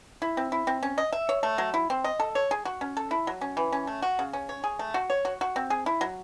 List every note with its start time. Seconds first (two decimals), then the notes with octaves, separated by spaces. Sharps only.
0.22 E4
0.37 C4
0.52 E4
0.67 C4
0.83 C#4
0.98 D#5
1.12 E5
1.29 C#5
1.43 A3
1.58 F#3
1.74 E4
1.90 C4
2.04 D#5
2.20 A4
2.35 C#5
2.51 G#4
2.65 F#4
2.81 C#4
2.97 A4
3.11 E4
3.27 F#3
3.41 C#4
3.57 E3
3.72 C#4
3.87 A3
4.02 F#4
4.19 C#3
4.33 C#4
4.49 C#5
4.64 G#4
4.79 A3
4.94 F#4
5.10 C#5
5.25 F#4
5.41 F#4
5.56 C4
5.70 G#4
5.86 E4
6.01 F#3